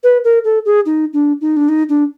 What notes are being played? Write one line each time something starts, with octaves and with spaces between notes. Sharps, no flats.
B4
A#4
A4
G#4
D#4
D4
D#4
D4
D#4
D4